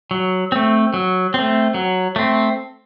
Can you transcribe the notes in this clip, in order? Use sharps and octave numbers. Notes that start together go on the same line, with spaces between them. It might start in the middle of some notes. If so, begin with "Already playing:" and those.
F#3
A3 C4
F#3
A3 C4
F#3
A3 C4